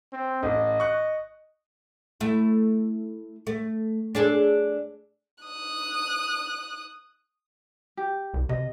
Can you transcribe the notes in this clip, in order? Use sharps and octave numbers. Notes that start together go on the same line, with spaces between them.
C4
A1 D#5
C#6 F#6
A3 E4
A3
D4 G#4 A4
D#6 F#6
G4
C2
C3 D#5